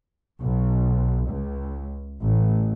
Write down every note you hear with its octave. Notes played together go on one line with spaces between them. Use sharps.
B1
C#2
A1